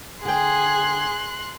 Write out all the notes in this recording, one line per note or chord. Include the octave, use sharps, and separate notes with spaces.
D3 G#4 G5 C6 F#6